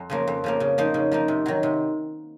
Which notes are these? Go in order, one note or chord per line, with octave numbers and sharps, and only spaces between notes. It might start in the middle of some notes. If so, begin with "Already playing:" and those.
Already playing: F2
C#3 F3 A#3
F2
C#3 F3 A#3
C#3
F3 A#3 D#4
C#3
F3 A#3 D#4
C3
D#3 F#3
C3